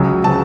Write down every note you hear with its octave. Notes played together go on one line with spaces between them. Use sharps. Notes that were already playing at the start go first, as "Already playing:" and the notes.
Already playing: C#2 C#3 F#3
C#3 F#3 A5